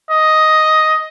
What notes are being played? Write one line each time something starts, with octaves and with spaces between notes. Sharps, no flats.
D#5